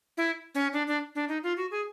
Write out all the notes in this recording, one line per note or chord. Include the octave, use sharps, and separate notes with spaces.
E4
C#4
D4
D4
D4
D#4
F4
F#4
G#4